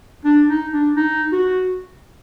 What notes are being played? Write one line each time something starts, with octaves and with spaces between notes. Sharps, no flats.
D4
D#4
D4
D#4
F#4